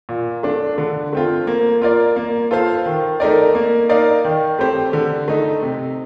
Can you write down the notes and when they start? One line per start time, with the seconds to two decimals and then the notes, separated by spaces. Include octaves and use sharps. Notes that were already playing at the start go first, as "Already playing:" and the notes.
0.09 A#2
0.43 A3 D4
0.78 D3
1.13 A3 C4 F4
1.47 A#3
1.82 F4 A#4 D5
2.16 A#3
2.51 F4 A4 C5 F5
2.86 D#3
3.20 A3 D#4 A#4 D5
3.55 A#3
3.89 D#4 A#4 D5 F5
4.25 D#3
4.59 A3 C4 G4 C5
4.93 D3
5.28 A3 D#4
5.62 C3